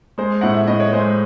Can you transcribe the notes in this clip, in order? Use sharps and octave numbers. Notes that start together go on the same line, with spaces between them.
G#3 C5
A2 F#5
E5
A2 D#5
C#5
G#3 C5